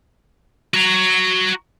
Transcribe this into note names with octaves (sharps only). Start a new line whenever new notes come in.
F#4 A#5